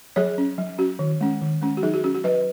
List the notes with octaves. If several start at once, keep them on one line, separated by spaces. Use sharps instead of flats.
F#3 G#4 C#5
C#4
F#3
C#4 F#4
D#3
G#3 C#4
D#3
G#3 C#4
F#4
F#3 D#4 G#4
F#4
C#4 F#4
F#4
F#3 B4 D#5